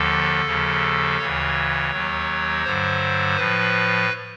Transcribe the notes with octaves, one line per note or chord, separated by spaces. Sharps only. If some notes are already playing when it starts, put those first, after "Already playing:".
Already playing: D#2 D3 F3 A4
D#2 C#3 F3
D2 C#3 E3 C#5
D#2 D#3 F#3
G2 D3 F#3 C5
A2 F3 B4